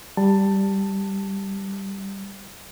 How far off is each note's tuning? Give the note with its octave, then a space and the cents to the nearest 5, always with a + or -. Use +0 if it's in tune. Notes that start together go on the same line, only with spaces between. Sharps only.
G3 +0 A5 +10